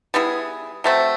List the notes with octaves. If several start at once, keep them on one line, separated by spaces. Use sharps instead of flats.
G3 B3 E4 G#4
F#3 A3 C4